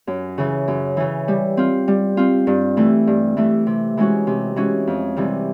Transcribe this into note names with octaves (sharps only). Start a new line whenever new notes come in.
F#2
C#3 E3
F#2
C#3 E3
G3
C4 F4
G3
C4 F4
G2
E3 A3
G2
E3 A3
C3
E3 G#3 C#4 F#4
C3
E3 G#3 C#4 F#4
F2
C3 E3 G3